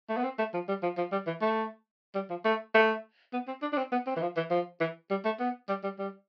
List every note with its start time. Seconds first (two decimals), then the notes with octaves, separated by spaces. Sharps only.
0.09 A3
0.17 B3
0.24 C4
0.38 A3
0.54 F3
0.69 G3
0.83 F3
0.98 F3
1.12 G3
1.27 E3
1.42 A3
2.15 G3
2.30 F3
2.45 A3
2.75 A3
3.33 B3
3.47 C4
3.62 D4
3.73 D4
3.78 C4
3.92 B3
4.07 C4
4.16 E3
4.22 F3
4.37 E3
4.51 F3
4.81 E3
5.11 G3
5.25 A3
5.40 B3
5.69 G3
5.84 G3
5.99 G3